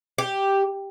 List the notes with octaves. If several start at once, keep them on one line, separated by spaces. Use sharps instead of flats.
G4